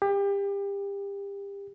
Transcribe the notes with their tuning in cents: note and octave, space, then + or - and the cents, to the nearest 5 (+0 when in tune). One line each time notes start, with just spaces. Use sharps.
G4 +30